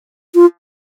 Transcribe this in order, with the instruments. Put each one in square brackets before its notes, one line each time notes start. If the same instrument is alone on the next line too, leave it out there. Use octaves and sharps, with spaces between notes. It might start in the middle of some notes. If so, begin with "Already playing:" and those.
[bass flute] F4